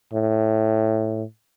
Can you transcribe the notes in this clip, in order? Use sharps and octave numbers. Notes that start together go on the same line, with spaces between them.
A2